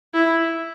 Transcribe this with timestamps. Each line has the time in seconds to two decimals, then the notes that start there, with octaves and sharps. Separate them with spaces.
0.14 E4